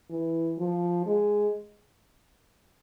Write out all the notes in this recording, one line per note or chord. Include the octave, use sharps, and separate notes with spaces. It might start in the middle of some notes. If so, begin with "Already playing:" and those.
E3
F3
G#3